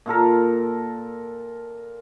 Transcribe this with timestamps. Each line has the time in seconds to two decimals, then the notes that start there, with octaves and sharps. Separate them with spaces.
0.06 A#2 F4 A4 A#4